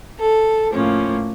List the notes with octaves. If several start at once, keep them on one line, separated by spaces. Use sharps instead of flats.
A4
A2 F3 A#3 C#4